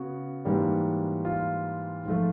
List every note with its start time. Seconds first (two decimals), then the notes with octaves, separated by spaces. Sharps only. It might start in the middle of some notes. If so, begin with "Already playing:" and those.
Already playing: C#3 B3 F#4
0.45 G#2 E3 G3 A#3
1.25 F4
2.05 G#2 F3 A3